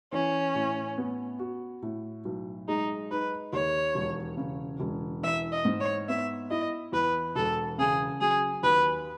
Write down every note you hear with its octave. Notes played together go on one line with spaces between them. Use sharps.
E3 C#4
A2
B3
F#4
A2
B1
G#3 D#4
D#4 B4
D#2 C#5
E1
C#3
E1
E3 E5
D#5
G#2
C#5
B3 E5
E4 D#5
E2 B4
E1 A4
C#3 G#4
F#3 G#4
D#2 B4